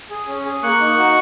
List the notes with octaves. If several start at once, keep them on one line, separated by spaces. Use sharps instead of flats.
G#4
C#4
G#4
A#3 C#6 F#6
D#4
F#4